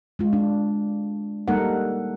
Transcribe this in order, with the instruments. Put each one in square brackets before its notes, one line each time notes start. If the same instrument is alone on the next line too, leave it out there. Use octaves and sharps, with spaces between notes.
[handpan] G#3 F4
D4
G3 A#3 D#4 A4 A#4 F#5